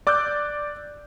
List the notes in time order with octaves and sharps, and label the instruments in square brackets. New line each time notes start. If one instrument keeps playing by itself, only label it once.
[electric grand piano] D5 D6 E6 F#6 G6